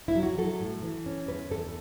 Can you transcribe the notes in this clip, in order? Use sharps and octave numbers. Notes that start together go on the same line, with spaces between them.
E4
F#3
F#4
F#3 A4
A2
E3
C#4
E2 B4
E2 A4